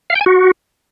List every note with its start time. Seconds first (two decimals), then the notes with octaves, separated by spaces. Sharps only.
0.10 F5
0.15 G5
0.21 G#5
0.26 F#4